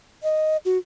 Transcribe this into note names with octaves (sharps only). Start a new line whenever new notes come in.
D#5
F#4